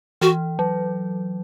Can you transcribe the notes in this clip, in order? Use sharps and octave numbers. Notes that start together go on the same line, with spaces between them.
E3 F#4
F#3